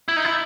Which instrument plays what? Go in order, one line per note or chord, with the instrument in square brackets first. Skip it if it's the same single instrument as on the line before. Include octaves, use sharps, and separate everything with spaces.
[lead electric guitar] E4
D#4
E4